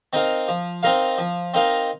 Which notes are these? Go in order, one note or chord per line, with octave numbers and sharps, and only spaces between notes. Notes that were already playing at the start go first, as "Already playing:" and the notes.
C4 D#4 A#4 F5
F3
C4 D#4 A#4 F5
F3
C4 D#4 A#4 F5